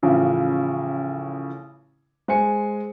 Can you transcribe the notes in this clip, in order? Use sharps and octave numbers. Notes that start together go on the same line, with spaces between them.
A1 C#3 F3
G#3 C5 G#5 C#7